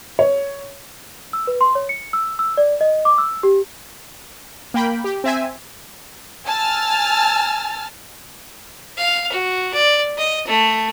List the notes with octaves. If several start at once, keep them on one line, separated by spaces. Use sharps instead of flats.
C#5
E6
B4
C6
C#5
C#7
E6
E6
D5
D#5
D6
E6
G4
A#3 G5 B5
G4
C4 E5 G#5
G#5 A5 E6 F6 A6
F5
F#4
D5
D#5
A3